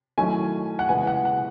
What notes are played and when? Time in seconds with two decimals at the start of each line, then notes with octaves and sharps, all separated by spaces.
0.18 D#3 F#3 A3 C#4 E4 G#5
0.79 F#5
0.89 C#3 E3 G#3 B3 G#5
1.07 F#5
1.25 F#5